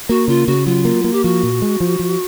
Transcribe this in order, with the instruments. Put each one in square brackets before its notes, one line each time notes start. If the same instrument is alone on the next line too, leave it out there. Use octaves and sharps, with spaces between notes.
[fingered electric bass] A#3 [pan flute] F#4
[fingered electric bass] C#3 [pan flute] F4
[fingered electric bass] C#3 [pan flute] F#4
[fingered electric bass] F#3 [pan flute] F4
[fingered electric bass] A#3
A#3
[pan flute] G4
[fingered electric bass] F3 [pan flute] F#4
[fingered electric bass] A#2
G#3
F3
F3